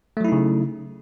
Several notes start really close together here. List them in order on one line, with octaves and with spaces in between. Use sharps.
A3 F#3 E4 D#4 C#3